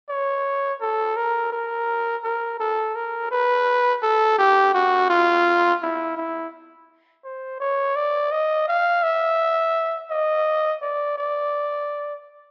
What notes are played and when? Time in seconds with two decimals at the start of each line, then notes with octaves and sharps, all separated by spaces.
0.09 C#5
0.81 A4
1.16 A#4
1.52 A#4
2.24 A#4
2.60 A4
2.95 A#4
3.31 B4
4.03 A4
4.38 G4
4.74 F#4
5.10 F4
5.82 E4
6.17 E4
7.24 C5
7.60 C#5
7.96 D5
8.31 D#5
8.68 F5
9.03 E5
10.11 D#5
10.82 D5
11.18 D5